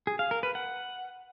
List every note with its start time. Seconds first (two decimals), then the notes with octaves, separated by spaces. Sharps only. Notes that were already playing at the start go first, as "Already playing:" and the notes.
0.07 G#4
0.19 F5
0.31 A#4
0.43 B4
0.55 F#5